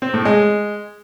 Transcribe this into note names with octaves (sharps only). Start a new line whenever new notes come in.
C4
A2
G#3